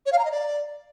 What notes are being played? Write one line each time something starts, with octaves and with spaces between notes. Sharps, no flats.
C#5
F5
A#5
D#5
D5